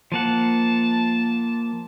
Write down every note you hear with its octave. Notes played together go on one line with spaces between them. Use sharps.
F3 A#3 F#5 A5